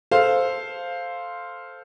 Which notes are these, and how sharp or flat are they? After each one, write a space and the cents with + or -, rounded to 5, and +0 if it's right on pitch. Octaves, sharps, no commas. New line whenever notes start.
A4 +0 C5 +0 F5 +0